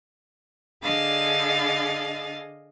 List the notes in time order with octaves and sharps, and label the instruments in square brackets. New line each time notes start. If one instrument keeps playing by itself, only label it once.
[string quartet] D3 D4 G#4 D#5 F5 A6